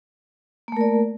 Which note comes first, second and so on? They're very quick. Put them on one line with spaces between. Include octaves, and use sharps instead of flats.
A#3 A3 A#4 D5